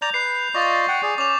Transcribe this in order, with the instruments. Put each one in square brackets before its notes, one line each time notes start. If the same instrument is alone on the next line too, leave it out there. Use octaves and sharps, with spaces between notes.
[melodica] D5 A#5 [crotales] G6 F7
[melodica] B4 [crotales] C7
[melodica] F4 D5 D#5 [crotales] C#6 A6
[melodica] F#5 G5
G#4 D5
[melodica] C#4 [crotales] D6 F7